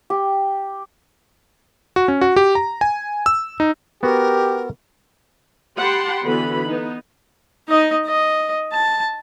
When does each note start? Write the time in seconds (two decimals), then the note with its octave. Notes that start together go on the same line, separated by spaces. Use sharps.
0.10 G4
1.96 F#4
2.08 C#4
2.21 F#4
2.36 G4
2.55 A#5
2.81 G#5
3.26 E6
3.60 D#4
4.03 B3 F#4 G4 A#4
5.78 G4 F#5 G5 A5 B5 C6
6.24 D3 E3 B3 F#4 B5
6.65 B3 D#4
7.68 D#4 D#5
8.06 D#5
8.73 A5